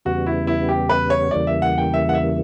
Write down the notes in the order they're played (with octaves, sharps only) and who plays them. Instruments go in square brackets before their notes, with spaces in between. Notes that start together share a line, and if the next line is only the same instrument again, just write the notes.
[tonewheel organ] E2 C#3 G3 B3 [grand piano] F#4
[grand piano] E4
E4
G4
B4
C#5
[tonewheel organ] E2 C#3 E3 G3 A#3 [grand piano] D5
[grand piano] E5
F#5
G5
E5
F#5
E5